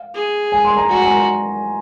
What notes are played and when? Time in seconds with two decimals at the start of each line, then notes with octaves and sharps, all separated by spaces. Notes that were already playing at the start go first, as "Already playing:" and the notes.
Already playing: F5
0.14 G#4
0.52 G#5
0.65 C6
0.77 A#5
0.89 F#4 G#5
1.02 G#5
1.08 A#5